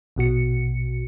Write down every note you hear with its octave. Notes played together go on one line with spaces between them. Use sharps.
A#1 B2 F#4 C#7